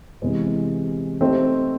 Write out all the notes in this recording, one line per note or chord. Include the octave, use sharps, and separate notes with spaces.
C3 E3 G#3 B3
A3 C4 D#4 G4 C5